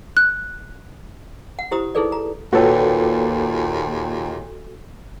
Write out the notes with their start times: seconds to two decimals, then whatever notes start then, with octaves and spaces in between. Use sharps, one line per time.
0.17 F#6
1.59 F#5
1.71 E4 G4 C5 A#5 D#6
1.95 D#4 E4 G#4 A4 B4 D5
2.12 A#5
2.53 D#2 A#2 F#4 A4 B4 C#5 G5